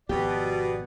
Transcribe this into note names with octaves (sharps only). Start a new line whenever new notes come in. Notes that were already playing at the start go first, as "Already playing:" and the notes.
G#1 B2 F3 B3 G4 D5